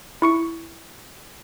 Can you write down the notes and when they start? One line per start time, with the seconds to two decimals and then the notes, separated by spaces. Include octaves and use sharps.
0.22 E4 C#6 C#7